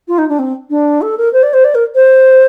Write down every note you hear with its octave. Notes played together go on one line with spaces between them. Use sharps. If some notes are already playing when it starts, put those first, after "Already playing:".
F4
D#4
D4
C4
D4
A4
A#4
C5
D5
C5
D5
A#4
C5